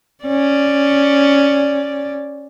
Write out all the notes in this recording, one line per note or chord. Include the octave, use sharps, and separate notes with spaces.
C#4 D5